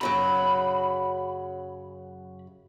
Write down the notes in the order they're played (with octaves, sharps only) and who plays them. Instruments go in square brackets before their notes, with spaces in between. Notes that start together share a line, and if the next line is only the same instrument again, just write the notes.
[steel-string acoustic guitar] F#2 C#3 F#3 [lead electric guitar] B5